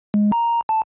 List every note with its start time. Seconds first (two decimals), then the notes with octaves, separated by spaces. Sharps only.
0.14 G#3
0.32 A#5
0.69 A5